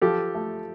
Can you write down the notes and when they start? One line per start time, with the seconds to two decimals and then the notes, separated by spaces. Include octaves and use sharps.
0.02 F3 G4 A4
0.35 A3